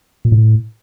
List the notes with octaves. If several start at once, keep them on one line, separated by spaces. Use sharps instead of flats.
A#2
A2